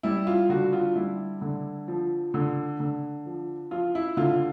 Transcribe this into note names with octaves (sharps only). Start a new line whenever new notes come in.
G3 E4
F4
D3 F#4
F4
G3 E4
D3
F3
D3
D3
F3
F3 F4
E4
D3 F4